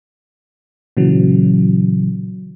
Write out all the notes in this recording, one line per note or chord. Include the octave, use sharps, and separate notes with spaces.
A#2 C#3 E3 F#3